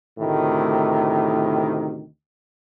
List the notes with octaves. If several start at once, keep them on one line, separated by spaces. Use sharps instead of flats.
D2 A2 C3 D#3